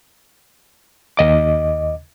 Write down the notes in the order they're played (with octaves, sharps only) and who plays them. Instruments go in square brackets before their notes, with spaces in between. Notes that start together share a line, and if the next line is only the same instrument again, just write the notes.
[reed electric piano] D#2 D#5 D6